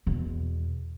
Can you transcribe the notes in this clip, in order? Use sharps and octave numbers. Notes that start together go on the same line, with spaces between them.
E2 B2